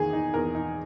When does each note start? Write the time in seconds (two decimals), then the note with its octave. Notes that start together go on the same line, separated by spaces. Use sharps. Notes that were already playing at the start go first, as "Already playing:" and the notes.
Already playing: E2 D#3 A#3 D#4 G#4
0.13 D#4
0.34 E2 A#4
0.55 D#4